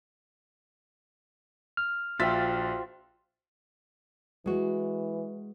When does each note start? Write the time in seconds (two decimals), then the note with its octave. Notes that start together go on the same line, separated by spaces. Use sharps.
1.77 F6
2.19 A#1 F4 F#4 C5 E5 G5 A6 B6
4.46 E3 G#3 F#4